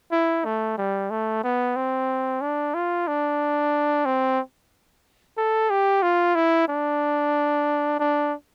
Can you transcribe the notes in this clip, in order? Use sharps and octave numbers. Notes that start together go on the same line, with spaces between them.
E4
A3
G3
A3
B3
C4
D4
F4
D4
C4
A4
G4
F4
E4
D4
D4